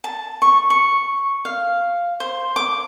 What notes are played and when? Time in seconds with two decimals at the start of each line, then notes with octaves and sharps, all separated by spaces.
0.04 A5
0.42 C#6
0.70 C#6
1.45 F5
2.20 C5
2.56 D6